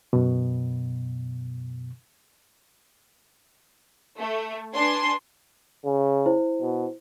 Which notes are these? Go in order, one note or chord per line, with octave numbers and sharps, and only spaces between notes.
F#2 B2
A3
D4 B4 G#5 C6
C#3
E4 C5
B2